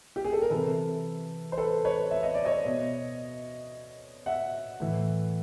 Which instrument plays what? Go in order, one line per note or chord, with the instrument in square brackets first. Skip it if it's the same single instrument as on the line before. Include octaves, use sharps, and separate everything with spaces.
[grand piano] G4
G#4
A4
A#4
C3 E3 A4 B4
C5
A4 B4
B4 C#5
E5
D#5
D5
C#5 D#5
B2
E5 F#5
A2 E3